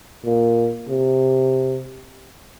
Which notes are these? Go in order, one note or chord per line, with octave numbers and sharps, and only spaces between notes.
A#2
C3